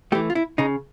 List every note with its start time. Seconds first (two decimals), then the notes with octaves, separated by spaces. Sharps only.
0.12 A3 G4
0.15 E3
0.30 F4
0.35 E4
0.58 C#3 D#4